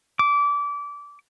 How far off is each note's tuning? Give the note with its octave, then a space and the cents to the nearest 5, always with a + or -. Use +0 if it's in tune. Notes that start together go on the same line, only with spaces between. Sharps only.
D6 -25